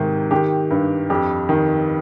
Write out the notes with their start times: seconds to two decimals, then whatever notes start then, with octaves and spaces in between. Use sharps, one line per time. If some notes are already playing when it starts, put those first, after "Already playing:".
Already playing: G#2 C3 D#3
0.31 D#3 G4
0.71 G2
1.10 F2 G4
1.49 D#3